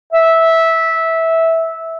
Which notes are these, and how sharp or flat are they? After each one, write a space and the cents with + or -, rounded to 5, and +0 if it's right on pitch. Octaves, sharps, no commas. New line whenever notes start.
E5 -15